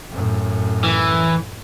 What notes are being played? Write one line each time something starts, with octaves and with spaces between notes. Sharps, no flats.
F#2 A2
E3